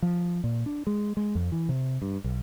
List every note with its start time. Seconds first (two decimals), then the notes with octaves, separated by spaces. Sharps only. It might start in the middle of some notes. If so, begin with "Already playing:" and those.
0.02 F3
0.44 A#2
0.66 D4
0.87 G#3
1.17 G#3
1.35 F2
1.52 E3
1.69 C3
2.02 G2
2.24 B1